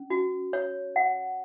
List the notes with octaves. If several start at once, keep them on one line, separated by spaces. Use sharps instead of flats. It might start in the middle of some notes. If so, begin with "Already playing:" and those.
Already playing: C#4
F#4
C#5
F#5